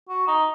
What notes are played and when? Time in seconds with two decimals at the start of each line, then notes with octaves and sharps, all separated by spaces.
0.09 F#4
0.27 D#4